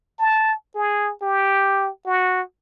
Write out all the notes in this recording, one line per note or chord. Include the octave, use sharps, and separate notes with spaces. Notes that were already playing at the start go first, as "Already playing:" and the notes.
A5
G#4
G4
F#4